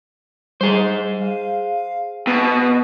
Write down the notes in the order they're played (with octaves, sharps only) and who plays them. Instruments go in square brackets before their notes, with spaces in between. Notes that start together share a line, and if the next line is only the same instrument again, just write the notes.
[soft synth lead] G3 [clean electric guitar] G#4 C5
[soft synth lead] F5
[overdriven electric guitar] B2 [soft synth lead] D#6